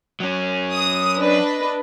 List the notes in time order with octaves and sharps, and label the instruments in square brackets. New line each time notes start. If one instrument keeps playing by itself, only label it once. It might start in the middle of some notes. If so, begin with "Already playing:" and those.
[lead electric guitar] F#3 C#4
[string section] D#6
D4 B4 D#5